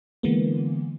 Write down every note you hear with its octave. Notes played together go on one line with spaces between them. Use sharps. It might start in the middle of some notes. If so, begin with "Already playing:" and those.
D3 E3 G#3 A#3 B3